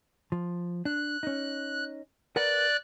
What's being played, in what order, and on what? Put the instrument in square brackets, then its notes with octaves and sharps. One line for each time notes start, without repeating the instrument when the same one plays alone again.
[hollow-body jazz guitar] F3
[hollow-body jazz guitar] D4 [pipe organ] F#6
[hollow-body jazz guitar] C#4 D#4
[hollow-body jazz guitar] A#4 B4 F#5 [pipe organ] D5 F#6